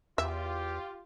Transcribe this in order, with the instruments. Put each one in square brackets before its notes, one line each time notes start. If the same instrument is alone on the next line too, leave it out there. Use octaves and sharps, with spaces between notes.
[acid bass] E2 [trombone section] F4 G4 [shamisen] E5